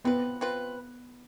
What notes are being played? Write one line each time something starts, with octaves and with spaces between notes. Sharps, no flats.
B3 C4 F4 B4
C4 F4 B4